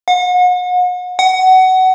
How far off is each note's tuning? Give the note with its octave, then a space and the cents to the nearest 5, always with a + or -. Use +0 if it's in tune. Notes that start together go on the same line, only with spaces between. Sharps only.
F#5 -40
F#5 +20